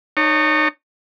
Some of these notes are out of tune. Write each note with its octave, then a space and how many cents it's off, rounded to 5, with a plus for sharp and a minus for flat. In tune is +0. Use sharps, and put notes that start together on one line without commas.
D#4 -20 C#5 +0 A#5 -45